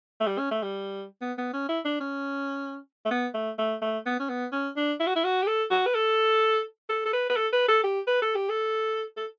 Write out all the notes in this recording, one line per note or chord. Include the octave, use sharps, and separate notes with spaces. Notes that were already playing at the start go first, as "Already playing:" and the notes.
A3
G3
C#4
A3
G3
B3
B3
C#4
E4
D4
C#4
A3
B3
A3
A3
A3
B3
C#4
B3
C#4
D4
E4
F#4
E4
F#4
G4
A4
F#4
B4
A4
A4
A4
B4
B4
A4
B4
A4
G4
B4
A4
G4
A4
A4